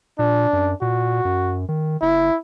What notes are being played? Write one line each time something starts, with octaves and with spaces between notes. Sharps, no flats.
A#2 D4
F#2
A#2 F#4
F#2
D#3
F#1 E4